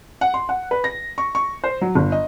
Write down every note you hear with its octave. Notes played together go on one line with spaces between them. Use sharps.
F#5
C6
F#5
B4
A#6
C#6
C#6
C5
F#3
G1
D#5